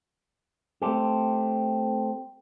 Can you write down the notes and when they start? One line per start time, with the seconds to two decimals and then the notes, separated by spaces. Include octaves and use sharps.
0.82 A3 C4 G4